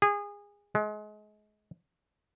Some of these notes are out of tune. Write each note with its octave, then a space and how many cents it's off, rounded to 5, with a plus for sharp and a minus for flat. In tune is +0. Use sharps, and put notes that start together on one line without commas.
G#4 -25
G#3 +30